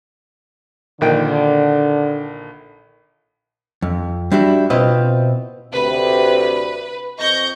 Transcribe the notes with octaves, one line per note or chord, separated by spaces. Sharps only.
A#1 D3 D#3 G5
F2
G3 D4 E4 F#4 G4
B2 C4 E4 F4 B4 D#5
D2 C3 B4
F2 C4 D#5 C#6 G6 A#6